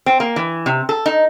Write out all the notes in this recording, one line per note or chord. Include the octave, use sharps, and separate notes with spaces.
C4
A#3
E3
C3
A4
D#4